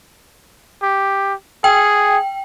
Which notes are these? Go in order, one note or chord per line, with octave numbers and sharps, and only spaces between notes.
G4
G#4 G5